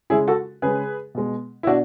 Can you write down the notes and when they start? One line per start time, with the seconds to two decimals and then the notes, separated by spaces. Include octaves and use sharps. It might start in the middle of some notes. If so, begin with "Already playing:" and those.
0.10 C#3 G#3 E4 G#4
0.28 F#4 A4
0.62 C#3 G#3 G#4 B4
1.15 B2 G#3
1.63 E4
1.67 B2 D4 F#4